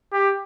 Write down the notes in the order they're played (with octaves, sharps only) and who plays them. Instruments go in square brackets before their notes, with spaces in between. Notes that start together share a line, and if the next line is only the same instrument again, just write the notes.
[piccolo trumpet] G4